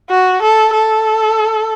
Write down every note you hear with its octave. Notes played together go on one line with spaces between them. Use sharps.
F#4
A4
A4